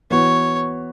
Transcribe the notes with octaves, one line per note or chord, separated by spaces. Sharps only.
E3 B3 F#4 C#5